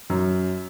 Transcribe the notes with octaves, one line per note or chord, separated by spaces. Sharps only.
F#2